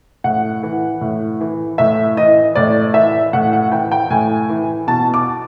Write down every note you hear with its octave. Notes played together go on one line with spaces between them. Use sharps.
A2 F#5
E3
A2
E3
A2 E5
E3 D#5
A2 D5
E3 E5
A2 F#5
F#5
E3 G5
G5
A2 G#5
E3
B2 A5
D6